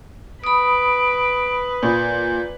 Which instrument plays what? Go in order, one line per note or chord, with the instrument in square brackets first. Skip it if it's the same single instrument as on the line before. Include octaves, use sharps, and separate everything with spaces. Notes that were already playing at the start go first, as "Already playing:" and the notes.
[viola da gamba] B4 [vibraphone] B5 D#6 [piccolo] D7
[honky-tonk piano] A#2 [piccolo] G6